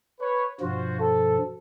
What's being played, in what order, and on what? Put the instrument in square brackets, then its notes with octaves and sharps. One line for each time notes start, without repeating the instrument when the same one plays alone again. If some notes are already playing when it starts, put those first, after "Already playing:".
[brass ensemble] B4 C#5
[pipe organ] G2 B2 F3 [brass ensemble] F4 F#4 C5
[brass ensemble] A4